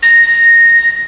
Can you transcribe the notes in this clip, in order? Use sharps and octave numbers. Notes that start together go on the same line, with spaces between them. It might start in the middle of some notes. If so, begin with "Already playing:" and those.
A#6